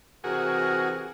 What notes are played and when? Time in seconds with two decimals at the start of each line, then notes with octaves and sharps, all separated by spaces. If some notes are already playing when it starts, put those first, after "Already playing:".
0.24 C3 E3 F#4 G#4 A#4